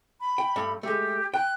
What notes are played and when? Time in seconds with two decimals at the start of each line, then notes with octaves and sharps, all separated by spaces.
0.20 B5
0.38 G5
0.56 G2 A3
0.83 G#3 A3 G4
1.34 G5 F#6